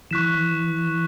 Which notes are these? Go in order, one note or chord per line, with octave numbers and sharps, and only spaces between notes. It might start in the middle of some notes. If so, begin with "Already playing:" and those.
E3 C#6 F#6 B6 E7